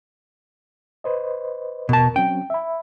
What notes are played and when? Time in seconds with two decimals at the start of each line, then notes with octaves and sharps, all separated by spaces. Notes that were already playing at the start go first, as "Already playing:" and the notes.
1.04 B4 C5 D#5
1.89 E2 B2 A#4 A5
2.16 F#3 C4 C#4 G5
2.50 E5 B5